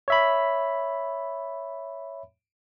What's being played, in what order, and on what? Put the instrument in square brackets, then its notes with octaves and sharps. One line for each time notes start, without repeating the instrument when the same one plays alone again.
[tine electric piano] C#5 E5 B5